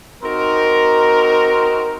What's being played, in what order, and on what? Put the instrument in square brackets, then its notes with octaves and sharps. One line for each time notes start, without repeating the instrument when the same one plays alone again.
[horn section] C4 D#4 F#4 A#4